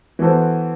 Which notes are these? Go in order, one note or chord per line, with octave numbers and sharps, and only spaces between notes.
E3 B3 F#4 A4 C5